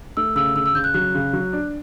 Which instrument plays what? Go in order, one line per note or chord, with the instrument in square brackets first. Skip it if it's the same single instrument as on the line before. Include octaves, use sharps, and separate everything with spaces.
[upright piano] A3 [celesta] E6
[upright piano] C#3 [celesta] E6
[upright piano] C#3 [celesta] E6
[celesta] E6
[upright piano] C#3 [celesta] G6
[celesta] F#6
[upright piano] F#3 [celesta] F#6
[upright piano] C#3
F#3
D4